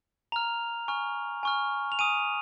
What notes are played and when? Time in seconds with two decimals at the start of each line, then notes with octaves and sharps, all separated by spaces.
0.32 A#5 F6 F7
0.88 G#5 C#6 F6
1.43 G#5 C#6 F6
1.92 F7
1.99 G#5 D#6 D#7